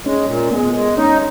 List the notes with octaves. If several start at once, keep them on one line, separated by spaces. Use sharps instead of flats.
G#3 C#4
A#2
G#3 B3
G#3
C#4 D#4